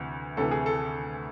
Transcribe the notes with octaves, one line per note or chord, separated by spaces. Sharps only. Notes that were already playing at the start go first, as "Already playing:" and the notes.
Already playing: D2 C3 E3
D2 C3 E3 A4
G#4
A4